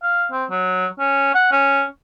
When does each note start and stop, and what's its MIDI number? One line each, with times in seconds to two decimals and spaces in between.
0.03 0.27 77
0.32 0.45 60
0.51 0.87 54
0.99 1.32 61
1.35 1.47 78
1.52 1.84 61